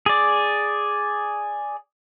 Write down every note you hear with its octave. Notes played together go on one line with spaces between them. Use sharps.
G#4 D5